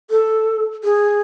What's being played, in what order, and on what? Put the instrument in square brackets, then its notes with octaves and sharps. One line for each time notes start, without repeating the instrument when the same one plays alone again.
[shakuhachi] A4
G#4